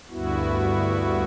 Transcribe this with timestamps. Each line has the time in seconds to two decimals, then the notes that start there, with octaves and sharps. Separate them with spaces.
0.10 D2 G2 B3 E4 F#4